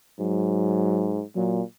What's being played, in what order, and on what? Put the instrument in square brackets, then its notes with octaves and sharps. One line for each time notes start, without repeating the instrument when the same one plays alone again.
[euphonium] G#2 [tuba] F#3
[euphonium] A#2 [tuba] F#3